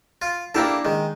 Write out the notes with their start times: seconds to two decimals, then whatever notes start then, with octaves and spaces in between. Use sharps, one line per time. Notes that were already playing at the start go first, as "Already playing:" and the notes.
0.22 F4
0.55 A#3 D4 E4 G4 A4 F5
0.85 D#3 G#3